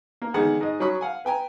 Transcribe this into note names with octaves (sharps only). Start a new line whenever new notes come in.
A#3
E2 D3 D#3 G#3 D#4 F#5
G#2 D#5
F#3 C#4 B5 C#6 D#6
F5 F#5 G#5
B4 G5 G#5 A#5